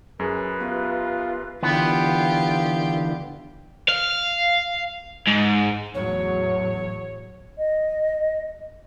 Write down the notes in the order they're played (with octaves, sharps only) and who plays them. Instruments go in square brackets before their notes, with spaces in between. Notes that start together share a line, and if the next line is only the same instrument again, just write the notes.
[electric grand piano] F#2 G#4 [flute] B4
[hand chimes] B3 G4 E5 [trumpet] F4
[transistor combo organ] D3 E3 [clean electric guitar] B3 [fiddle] F4 G4
[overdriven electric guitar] F5
G#2
[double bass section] E2 A2 F#3 [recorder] C#5
[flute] D#5